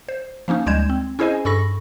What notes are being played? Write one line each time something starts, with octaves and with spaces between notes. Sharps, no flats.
C5
F3 A#3 C#4 D#4
D2 G3 G#3 G6 G#6 E7
C4
C#4 E4 G#4 C5 D#5 G#5
G2 A4 B5 C#6 A#6